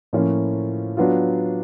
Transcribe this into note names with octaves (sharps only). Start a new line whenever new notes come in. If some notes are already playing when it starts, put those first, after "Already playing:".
A2 F3 A#3 C#4 F4
F#3 B3 D4 F4